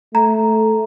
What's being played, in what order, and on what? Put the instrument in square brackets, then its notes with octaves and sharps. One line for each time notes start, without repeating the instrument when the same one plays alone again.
[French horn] A3 [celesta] A#5